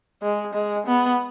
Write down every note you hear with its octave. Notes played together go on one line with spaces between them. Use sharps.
G#3
G#3
B3